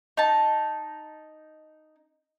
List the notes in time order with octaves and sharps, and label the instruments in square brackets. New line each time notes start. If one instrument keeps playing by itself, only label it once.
[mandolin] D#4 A5